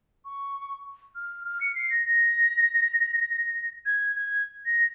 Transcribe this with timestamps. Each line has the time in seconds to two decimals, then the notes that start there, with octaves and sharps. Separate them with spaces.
0.25 C#6
1.15 F6
1.45 F6
1.61 C#7
1.75 C7
1.90 A#6
2.05 A#6
3.86 G#6
4.16 G#6
4.66 A#6